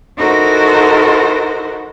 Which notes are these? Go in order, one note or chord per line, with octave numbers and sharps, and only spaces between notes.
D#4 E4 F#4 A4 A#4 C5